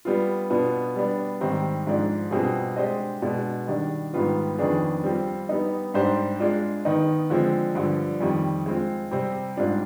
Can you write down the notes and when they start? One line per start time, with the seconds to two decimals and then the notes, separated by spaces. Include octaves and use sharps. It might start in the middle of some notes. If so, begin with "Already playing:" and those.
0.05 G3 B3 F4
0.50 B2 B3 D4 F4
0.96 G3 B3 D4
1.41 G#2 D#3 G3 C4
1.87 G#2 F3 G#3 D4
2.31 B2 G3 C4 F4 G#4
2.76 G#3 D4 G4 C5 D#5
3.22 B2 G#3 D4
3.67 D#3 G3 D4
4.13 G#2 D#3 G3 B3 F4
4.59 F2 D#3 B3 D4 G#4
5.04 G3 C4 F4
5.49 G3 B3 D#4
5.94 G#2 G3 D4 G4 C5
6.40 G#3 D4 F4
6.85 D#3 B3 D#4
7.30 D3 F3 G#3 C4
7.75 G2 D3 F3
8.21 F2 D#3 G3
8.66 G#3 C4 F4
9.11 C3 G3 C4
9.57 G#2 G3 D4 F4